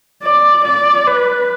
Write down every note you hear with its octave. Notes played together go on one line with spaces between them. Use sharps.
D5
D5
B4